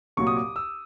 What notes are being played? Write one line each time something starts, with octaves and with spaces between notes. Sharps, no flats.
C2 A#2 F#3 C#6
D#6
D6
E6